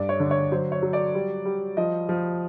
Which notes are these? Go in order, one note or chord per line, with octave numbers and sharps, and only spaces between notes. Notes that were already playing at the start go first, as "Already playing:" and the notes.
Already playing: G2 D5
C#5
D3
C#5
F#3 C5
C#5
F#3
D5
G3
G3
F3 D#5
F3